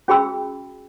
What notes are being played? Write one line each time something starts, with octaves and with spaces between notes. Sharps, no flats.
C#4 F#4 G#4 G5 B5 E6